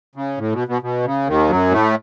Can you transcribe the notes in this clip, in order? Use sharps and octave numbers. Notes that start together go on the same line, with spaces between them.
C#3
A2
B2
B2
B2
C#3
D#2 D#3
F#2 F#3
A2 A3